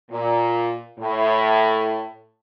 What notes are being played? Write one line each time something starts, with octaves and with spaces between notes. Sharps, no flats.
A#2
A2